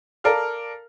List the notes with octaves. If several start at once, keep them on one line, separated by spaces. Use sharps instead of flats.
A4 A#4 D5 F5 F6